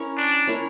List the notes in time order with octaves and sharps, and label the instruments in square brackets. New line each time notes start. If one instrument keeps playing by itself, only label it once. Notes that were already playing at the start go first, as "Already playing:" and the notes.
Already playing: [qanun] C#4 E4 A#4 C#5
[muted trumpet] D4
[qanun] C#4 E4 A#4 C#5